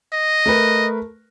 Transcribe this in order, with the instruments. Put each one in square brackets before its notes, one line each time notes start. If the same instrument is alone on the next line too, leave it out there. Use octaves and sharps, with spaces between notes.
[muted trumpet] D#5
[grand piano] A3 A#4 B4